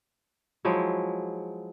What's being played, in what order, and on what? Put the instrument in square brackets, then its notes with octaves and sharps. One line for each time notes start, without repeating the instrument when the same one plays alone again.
[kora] F3 F#3 G#3 E4